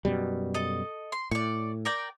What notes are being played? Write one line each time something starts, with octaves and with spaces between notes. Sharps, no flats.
F#2 B2 G3
A4 D#5
C6
A2 D5 C#6
A#4 D5 G5